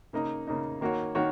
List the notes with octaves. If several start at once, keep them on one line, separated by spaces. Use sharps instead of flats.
C#3 A#3 D#4
C#3 A#3 D#4
D#3 A#3 F#4 C#5
D#3 A#3 F#4 C#5